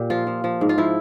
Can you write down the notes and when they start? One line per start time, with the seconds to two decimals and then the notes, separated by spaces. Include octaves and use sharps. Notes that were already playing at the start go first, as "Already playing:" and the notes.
Already playing: A#2 G4
0.10 F3 F4
0.27 F3
0.44 F3
0.61 G#2
0.69 F4
0.78 F3 E4